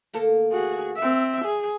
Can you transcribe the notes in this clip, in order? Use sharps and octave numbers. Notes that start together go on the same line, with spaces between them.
D2 A#3 A4
F#4 G#4
C4 E5
G#4